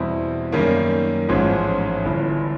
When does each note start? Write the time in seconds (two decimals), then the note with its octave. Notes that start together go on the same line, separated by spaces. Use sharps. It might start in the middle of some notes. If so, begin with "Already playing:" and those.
Already playing: E2 B2 G3 C4 E4
0.52 F#2 D#3 G3 A#3 C#4
1.29 A1 G#2 F3 G#3 C#4
2.05 G1 G2 E3